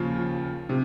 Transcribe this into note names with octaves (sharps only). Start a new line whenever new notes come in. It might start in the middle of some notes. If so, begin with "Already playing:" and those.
Already playing: D#2 C#3 F3 F4
C3